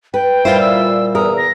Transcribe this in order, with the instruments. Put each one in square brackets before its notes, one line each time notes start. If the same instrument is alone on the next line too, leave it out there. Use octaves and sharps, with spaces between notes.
[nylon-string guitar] B4 [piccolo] G5
[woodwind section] A#2 G3 [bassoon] E4 [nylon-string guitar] F4 C5
[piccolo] E6
[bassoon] E2 [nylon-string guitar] A#4 [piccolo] D#6
[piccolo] A#6